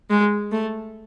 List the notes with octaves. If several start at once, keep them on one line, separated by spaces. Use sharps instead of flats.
G#3
A3